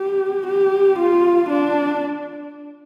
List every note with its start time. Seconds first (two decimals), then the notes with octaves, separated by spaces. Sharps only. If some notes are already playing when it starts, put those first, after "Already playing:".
Already playing: G4
0.47 G4
0.99 F4
1.49 D4